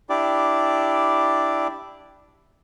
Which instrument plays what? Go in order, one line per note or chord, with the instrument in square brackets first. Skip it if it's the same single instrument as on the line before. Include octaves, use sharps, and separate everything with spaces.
[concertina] D4 E4 G4 D5